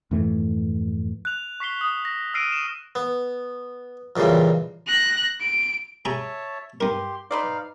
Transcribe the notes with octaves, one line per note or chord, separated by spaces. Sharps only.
F2 G#2 E3 A3
F#6 F7
C#6 B6 C7 G7
D#6
A#6
E6 F6 A#6 C7 D7 D#7
E7
B3
F2 A#2 C#3 E3 G3
F#6 A#6
D7
G4 G#4 C#5 E5 A5 A#5
G2 G4 A#4 C6
D#4 B4 C5 D5 F5